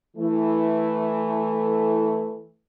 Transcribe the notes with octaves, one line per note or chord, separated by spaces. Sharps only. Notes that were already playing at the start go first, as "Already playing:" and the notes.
E3 A3